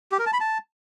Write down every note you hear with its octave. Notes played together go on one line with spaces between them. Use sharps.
G4
A#4
A5
B5
A5